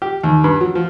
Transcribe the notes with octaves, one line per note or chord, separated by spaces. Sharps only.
G4
D#2
G2
F#3
F3